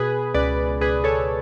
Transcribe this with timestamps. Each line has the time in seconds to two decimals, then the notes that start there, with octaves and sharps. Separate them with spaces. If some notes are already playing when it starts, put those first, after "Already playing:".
Already playing: B2 G#4 B4
0.34 C#2 B4 D5
0.81 C#2 G#4 B4
1.04 A4 C#5